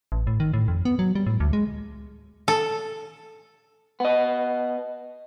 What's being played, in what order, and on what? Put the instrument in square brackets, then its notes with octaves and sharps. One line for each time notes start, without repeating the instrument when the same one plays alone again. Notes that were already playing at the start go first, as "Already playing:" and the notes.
[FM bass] A1
A2
D#3
A2
F2
B3
F#3
G3
A2
D2
G#3
[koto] A4
[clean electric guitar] B3 D#5